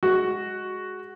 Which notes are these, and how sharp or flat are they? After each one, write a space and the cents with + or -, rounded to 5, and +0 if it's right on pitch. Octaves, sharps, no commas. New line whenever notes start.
G#3 +0 F#4 +0